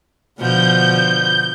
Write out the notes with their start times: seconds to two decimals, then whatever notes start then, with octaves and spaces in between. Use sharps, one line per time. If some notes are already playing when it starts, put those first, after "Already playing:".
0.39 B2 D3 F3 G6